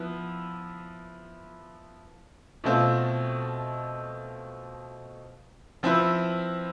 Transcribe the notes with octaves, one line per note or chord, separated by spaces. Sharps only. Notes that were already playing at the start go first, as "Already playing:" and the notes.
Already playing: F3 B3 E4
B2 A3 C4 F4
F3 C4 E4 B4